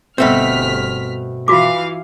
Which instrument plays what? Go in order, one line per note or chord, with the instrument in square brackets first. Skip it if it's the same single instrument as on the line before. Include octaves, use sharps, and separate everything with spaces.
[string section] G1 F6 B6 [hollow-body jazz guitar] B2 A3 C4
[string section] E3 F5 [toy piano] F4 F#4 D6